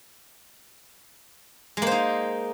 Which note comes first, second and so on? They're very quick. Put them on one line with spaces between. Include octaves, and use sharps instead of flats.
G#3 A#3 C5 D#4